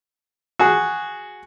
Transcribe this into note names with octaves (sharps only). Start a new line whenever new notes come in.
F#4 G#4